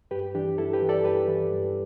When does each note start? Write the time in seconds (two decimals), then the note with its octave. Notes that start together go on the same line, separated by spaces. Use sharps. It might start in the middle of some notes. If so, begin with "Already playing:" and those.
0.11 G2 G4 B4
0.35 E3 D4 G4
0.58 G2 E4 A4
0.73 G4 B4
0.82 E3
0.89 A4 D5
1.04 G2 G4 B4
1.28 E3
1.52 G2